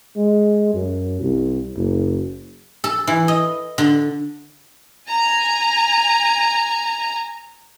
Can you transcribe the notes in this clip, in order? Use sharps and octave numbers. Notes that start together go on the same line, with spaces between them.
G#3
F#2
C2
F#1
A4
E3
D#5
D3
G#5 A#5